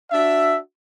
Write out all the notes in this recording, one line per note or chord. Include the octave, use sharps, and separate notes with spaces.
D4 F#4 E5